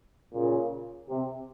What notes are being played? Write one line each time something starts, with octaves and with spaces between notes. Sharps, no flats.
A#2 C#3
C3